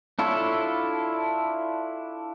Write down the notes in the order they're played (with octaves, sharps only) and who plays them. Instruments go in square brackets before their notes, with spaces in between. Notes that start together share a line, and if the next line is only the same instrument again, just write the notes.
[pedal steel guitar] D4 E4 F4 A4 C#5